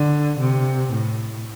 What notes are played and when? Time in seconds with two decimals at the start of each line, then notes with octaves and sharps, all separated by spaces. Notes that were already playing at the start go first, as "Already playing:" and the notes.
Already playing: D3
0.39 C3
0.92 A2